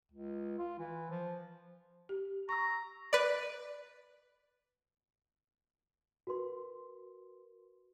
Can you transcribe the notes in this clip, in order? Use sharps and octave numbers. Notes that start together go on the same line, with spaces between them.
C#2
F4
E3
F3
G4
A#5 C#6 E6
B4 D5
F#4 A#4 B4 C6